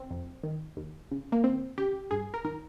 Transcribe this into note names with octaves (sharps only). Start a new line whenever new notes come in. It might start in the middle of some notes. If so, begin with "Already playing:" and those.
Already playing: C4
F2
D#3
D#2
C#3
A#3
D#2 C4
C#3 G4
G2 G#4
A#4
D#3 A#4